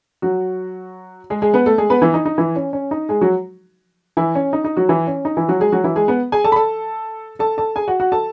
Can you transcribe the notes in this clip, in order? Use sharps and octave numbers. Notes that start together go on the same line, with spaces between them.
F#3 F#4
G#3 G#4
G#3 G#4
B3 B4
A3 A4
G#3 G#4
B3 B4
E3 E4
D#4
D#4
E3 E4
C#4
C#4
D#4
G#3 G#4
F#3 F#4
E3 E4
C#4
D#4
D#4
F#3 F#4
E3 E4
C#4
D#4
E3 E4
F#3 F#4
G#3 G#4
F#3 F#4
E3 E4
G#3 G#4
B3 B4
G#4 G#5
A4 A5
B5
A4 A5
A4 A5
A4 A5
G#4 G#5
F#4 F#5
F#4 F#5
A4 A5